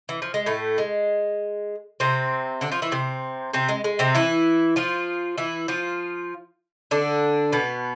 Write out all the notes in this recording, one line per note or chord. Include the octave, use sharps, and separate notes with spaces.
E3
F3
G#3
A2 A3
G#3
C3 C4
D3 D4
F3 F4
E3 E4
C3 C4
C3 C4
G#3
G#3
C3 C4
E3 E4
F3 F4
E3 E4
F3 F4
D3 D4
B2 B3